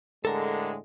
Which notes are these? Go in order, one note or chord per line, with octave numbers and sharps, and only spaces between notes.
A2 D3 G#3 A4 A#4